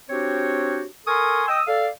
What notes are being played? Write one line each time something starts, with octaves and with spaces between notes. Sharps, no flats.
C4 D4 F#4 G4 C5 C#5
A4 A#4 G#5 C6 C#6 D#6
D#5 G5 D#6 E6
A4 D5 F5